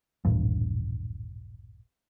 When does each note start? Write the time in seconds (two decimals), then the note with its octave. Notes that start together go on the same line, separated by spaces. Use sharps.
0.25 D#1 A1 G2